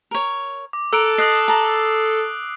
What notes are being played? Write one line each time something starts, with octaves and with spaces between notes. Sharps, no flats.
A#4 C#5
D6
A4 A#4 E6 F#6 D7
D#5 D#6 F#6 C7
A5 A#5